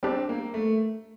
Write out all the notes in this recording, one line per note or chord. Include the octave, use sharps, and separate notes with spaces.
G3 C4 D4 G4
A#3
A3